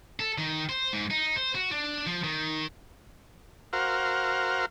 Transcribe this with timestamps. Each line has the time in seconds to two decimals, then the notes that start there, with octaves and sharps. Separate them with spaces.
0.20 A4
0.38 D#3
0.69 C5
0.93 G#2
1.11 D#4
1.36 C5
1.55 F#4
1.71 D4
2.07 F3
2.24 D#3
3.73 F#4 A#4 C5 F5